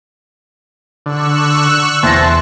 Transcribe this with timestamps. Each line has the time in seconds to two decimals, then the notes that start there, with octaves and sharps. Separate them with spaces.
1.06 D3 C#6 E6 F#6
2.03 E2 E4 C5 A5 A#6